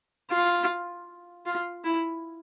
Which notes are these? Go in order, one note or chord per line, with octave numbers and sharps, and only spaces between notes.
F4
F4
E4